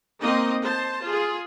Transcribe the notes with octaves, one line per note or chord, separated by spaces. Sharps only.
A#3 C4 D#4 D#5
C5 A5
F4 G#4